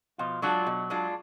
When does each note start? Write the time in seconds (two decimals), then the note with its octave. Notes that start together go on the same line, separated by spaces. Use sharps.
0.18 B2 F3 F4
0.42 F#3 G#3 D4 F4 F#4
0.66 B2
0.90 G#3 D4 F4